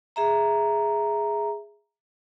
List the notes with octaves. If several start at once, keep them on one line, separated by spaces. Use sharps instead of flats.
G#4 E5 A#5